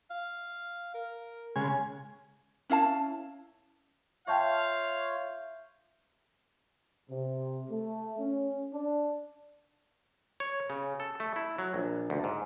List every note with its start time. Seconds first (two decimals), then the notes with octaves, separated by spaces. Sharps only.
0.10 F5
0.94 A#4
1.56 C#3 G#3 G#5
2.70 C#4 E4 F5 A5
4.27 F4 C#5 E5 F5 G5 A5 C#6 G6
7.10 C3
7.70 A3
8.19 C#4
8.73 D4
10.40 C#5
10.70 C#3
11.00 A4
11.20 A3
11.36 E4
11.58 F#3
11.74 A#1
12.10 D2
12.24 G#2